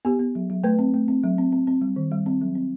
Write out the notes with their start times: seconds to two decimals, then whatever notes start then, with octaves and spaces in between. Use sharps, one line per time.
0.05 B3 G4
0.19 B3
0.35 F#3
0.50 F#3
0.64 A3 B4
0.79 C4
0.94 A3
1.08 C4
1.24 F#3
1.38 C4
1.52 C4
1.67 C4
1.81 G3
1.96 D#3
2.11 G3
2.26 C4
2.41 F#3
2.55 C4